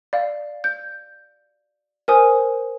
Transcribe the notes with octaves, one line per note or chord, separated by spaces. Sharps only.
D5 F5
G6
A#4 C5 G#5 D#6